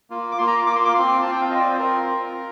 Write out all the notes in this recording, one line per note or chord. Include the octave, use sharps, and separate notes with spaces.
A#3 F4
D6
A#3 F4 C6
A#5
A#3 F4 D6
C6
D6
C4 F4 C6
C4 F4 A5
G5
F5
C4 F4 D5 D#5
C5
C4 F4 A#4
C4 F4
F4